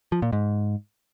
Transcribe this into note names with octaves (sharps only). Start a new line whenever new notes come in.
F3
A#2
G#2